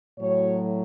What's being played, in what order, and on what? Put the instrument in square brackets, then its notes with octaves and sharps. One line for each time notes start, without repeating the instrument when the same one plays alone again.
[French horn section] A2 F#3 C#5